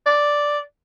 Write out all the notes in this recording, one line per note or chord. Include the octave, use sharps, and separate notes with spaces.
D5